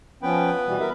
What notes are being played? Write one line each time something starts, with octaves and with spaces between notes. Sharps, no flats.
F3 B3 C#4 B4 G5
B2 E3 G3
A#4 E5